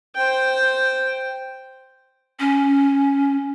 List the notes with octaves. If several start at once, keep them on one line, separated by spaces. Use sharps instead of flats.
C5 G5
C#4